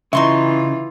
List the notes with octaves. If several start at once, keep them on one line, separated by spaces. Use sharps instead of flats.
C#3 E3 D#4 F4 E5 C6 C#6